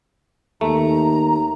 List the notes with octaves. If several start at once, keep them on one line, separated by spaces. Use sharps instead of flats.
D#2 A3 A#5